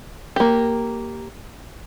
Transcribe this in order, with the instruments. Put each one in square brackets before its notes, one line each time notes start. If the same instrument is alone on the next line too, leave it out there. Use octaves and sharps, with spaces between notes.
[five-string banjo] A#3 G4